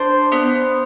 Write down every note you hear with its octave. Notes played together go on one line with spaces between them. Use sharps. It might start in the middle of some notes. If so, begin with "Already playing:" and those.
Already playing: D4 C5
B3